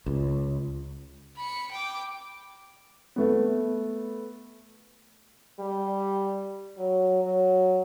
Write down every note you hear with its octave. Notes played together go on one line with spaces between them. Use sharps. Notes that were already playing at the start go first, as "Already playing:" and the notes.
C#2
B5 C#7
G5 D6
A3 B3
G3
F#3
F#3